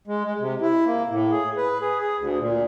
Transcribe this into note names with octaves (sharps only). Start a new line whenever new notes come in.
G#3
G#3
C3
E4
A#3
A2
G#4
B4
G#4
G#4
D2
A#2